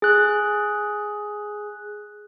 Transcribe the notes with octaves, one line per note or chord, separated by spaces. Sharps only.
G#4 F#6